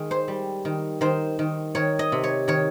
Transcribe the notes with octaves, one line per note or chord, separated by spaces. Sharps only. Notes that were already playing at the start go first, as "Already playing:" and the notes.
Already playing: D#3 G#3
C5
G3
D#3
D#3 C5
D#3
D#3 C#5
D#5
C3
C#5
D#3 C#5